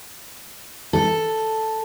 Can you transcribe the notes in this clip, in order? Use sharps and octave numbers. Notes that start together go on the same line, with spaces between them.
A4